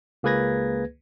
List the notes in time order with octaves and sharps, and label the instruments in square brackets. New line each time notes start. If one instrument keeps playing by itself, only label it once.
[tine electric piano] C#2 A#3 G#4 B4 G#6 A#6